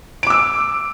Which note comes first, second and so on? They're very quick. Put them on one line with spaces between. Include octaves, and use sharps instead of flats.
D7 D6 E6